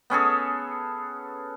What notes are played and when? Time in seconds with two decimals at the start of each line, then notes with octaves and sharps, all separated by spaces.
0.10 B3 C#4 G#4 A4